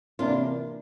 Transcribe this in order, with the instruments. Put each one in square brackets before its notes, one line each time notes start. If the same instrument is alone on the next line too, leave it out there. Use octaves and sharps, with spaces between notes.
[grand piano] C3 E3 A#3 E4 A#4 [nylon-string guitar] D4 F4